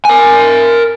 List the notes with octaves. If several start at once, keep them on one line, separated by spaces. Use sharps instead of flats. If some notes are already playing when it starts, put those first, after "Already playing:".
A#4 G#5